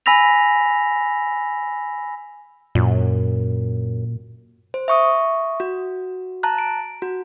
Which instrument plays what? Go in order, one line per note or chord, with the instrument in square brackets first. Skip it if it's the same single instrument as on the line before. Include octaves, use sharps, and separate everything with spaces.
[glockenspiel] G#5 B5 E6 A#6 B6 F7
[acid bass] F#2 [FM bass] A#2
[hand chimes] C5
E5 C#6 D#6
F#4
A5 A#5 F#6
D7
F#4